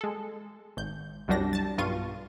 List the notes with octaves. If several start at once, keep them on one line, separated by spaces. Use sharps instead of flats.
G#3 A4
G#1 G6
C2 F#2 F#3 G3 D4 A#6
A5 A6
B1 G2 F4 C#6 D#7